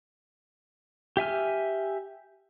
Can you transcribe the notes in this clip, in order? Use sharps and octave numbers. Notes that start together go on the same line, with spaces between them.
G4 E5 G#5 F6